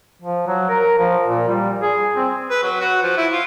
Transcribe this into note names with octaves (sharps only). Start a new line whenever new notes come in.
F3
F#3
A#4
F3
A#2
G3
G#4
C4
B4
F#3
F#4
F3
E4
F4